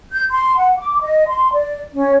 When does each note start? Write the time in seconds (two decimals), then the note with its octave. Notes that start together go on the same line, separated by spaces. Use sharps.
0.12 G6
0.30 C6
0.57 F#5
0.78 D6
1.01 D#5
1.28 C6
1.53 D5
1.93 C#4